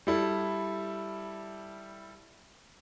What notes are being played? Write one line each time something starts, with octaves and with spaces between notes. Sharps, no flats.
G3 E4 A4